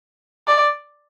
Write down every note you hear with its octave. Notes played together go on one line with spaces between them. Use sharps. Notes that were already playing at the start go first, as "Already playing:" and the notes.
D5